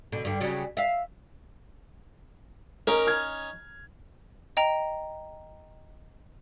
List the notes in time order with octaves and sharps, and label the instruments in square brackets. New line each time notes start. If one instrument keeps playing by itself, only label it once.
[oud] B2 D3
G2 D3
C#3 F#3 G3
E5 F5
[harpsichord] C#4 D#4 [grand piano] A#4
[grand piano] F6 G#6
[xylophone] D#5 G5 A#5